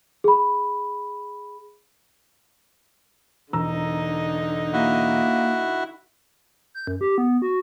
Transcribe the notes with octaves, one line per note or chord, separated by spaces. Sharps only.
G#4 B5
E1 D3 D#4 A#5 E6
A#3 E4 F#4
G6
F#2
G4
B3
F#4